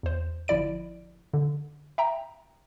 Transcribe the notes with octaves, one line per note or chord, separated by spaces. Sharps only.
E2 C5
G1 F3 E4 D5 D7
D3
E5 G5 A#5